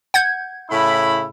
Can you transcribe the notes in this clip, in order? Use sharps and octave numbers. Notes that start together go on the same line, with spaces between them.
F#5 G6 G#6
A2 C#3 E4 B5